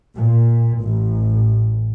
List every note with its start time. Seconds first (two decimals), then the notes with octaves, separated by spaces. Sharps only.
0.17 A#2
0.80 A1